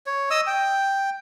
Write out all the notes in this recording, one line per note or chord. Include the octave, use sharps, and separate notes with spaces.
C#5
D#5 D#6 E6
G5